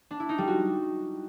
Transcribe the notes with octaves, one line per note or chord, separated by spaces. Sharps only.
D4
E4
D#4
G3
F#4